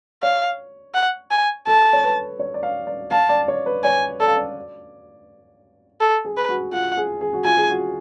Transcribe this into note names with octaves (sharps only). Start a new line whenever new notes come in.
C#5 F5
F#5
G#5
A4 A5
C#5
B4
C#5
D5
F5
D5
F5 A5
D5
C#5
B4
C#5 G#5
A4 D5
F5
D5
A4
G#4
B4
F#4
F4 F#5
G#4
G#4
F#4
F4 G#5
G#4
F#4